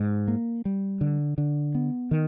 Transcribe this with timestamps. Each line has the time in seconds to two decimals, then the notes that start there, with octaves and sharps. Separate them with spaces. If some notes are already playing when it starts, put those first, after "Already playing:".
Already playing: G#2
0.28 A#3
0.65 G3
1.01 D3
1.38 D3
1.75 B3
2.11 D#3